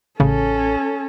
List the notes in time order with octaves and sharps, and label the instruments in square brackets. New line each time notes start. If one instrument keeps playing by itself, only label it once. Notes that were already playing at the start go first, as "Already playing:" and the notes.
[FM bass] A1 [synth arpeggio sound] C#3 [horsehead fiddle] C#4 A4